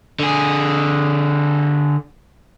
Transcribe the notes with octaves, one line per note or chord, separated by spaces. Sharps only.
D3 G#4